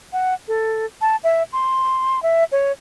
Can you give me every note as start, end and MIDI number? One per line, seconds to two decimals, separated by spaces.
0.13 0.34 78
0.48 0.86 69
1.01 1.16 81
1.24 1.43 76
1.53 2.22 84
2.23 2.44 76
2.52 2.72 73